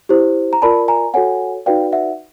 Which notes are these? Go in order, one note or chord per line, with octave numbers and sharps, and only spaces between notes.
E4 G4 C5
A#5
F4 A#4 D5 A5 B5
G#5 A#5
F#4 A4 C#5 F#5 G#5
D#4 F#4 B4 D5 F5 G5
E5 F#5